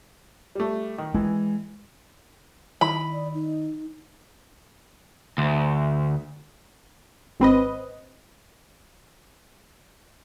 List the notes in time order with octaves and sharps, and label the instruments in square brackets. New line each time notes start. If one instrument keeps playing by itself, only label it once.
[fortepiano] G3 A3
D#3
[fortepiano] E3 [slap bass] G#3
[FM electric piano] D#3 E4 D#5 [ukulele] B5
[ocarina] D5
D#4
[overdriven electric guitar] D2
[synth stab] G#1 C4 B4 D#5